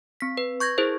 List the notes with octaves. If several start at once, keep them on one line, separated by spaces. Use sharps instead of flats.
C4 B6
B4
C#6 G6 G#6 A#6
E4 G#4 A#4 C5